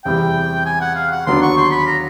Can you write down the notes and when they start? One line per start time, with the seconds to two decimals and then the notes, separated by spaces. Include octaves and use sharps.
0.05 E2 C3 E3 G3 G5
0.66 G#5
0.81 F#5
0.95 F5
1.11 F#5
1.26 D#2 D3 F#3 B3 D4 C6
1.42 C#6
1.57 C6
1.71 B5
1.87 A#5